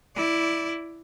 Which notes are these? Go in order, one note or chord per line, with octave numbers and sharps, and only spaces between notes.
E4 D5